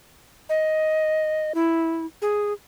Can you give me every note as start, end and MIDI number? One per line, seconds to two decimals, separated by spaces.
0.49 1.53 75
1.55 2.06 64
2.22 2.53 68